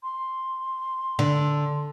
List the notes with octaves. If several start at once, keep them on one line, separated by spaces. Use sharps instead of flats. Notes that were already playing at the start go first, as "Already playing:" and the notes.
C6
D3